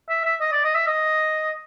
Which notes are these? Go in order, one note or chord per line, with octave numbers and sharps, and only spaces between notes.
E5
E5
D#5
D5
D#5
E5
D#5